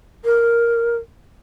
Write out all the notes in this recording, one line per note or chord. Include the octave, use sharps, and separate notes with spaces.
A#4